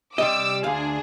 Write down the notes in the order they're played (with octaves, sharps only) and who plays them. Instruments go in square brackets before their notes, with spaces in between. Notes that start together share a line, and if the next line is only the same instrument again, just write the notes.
[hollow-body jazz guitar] C3 G3 D#5 [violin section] D6 E6
[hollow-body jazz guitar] D2 F5 [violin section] D4 G#4